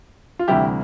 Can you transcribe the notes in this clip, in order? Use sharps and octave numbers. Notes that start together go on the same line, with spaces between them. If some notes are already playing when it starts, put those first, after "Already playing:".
F4
D2 C3 E3 G3 E4 G4